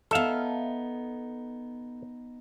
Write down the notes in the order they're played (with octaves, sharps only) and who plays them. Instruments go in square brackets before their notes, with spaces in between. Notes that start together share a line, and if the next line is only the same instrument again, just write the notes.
[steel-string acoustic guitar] B3 D#4 [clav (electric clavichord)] A4 E5 F5